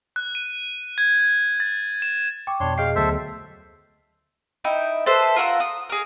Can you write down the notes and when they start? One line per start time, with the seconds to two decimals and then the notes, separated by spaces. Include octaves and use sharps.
0.16 F#6
0.35 D#7
0.98 G#6
1.60 A6
2.02 E7
2.47 G5 C#6 D6
2.60 F2 B2 D4 C#5 C6
2.78 G#4 D#5 F5 G5 C7
2.95 D2 F#3 B3 A4 C5 E5
4.64 D#4 E4 E5 G5
5.06 A4 B4 C5 E5
5.36 F4 A#4 F#5 E6
5.60 D#6
5.90 G#4 A#4